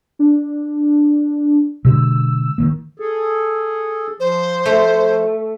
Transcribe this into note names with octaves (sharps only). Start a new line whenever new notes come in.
D4
B2 D3 G#3 E6
D#3 F#3 A#3
G#4 A4
F3 C5
A3